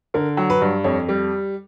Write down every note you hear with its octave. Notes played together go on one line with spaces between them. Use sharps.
D3 A#4
F#3
B4
G2
F2 C#5
G3